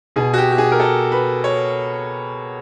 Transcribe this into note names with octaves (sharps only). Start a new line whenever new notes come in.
B2 G#4
F#4
G4
G4
G#4
A#4
A4
B4
C#5